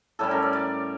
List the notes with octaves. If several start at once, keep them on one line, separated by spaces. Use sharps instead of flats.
A2 G3 C#4 A4
A#4
D5
D5